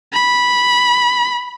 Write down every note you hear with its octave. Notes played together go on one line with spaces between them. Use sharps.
B5